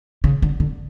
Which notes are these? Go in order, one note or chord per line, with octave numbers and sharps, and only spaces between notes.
C#3
D3
D3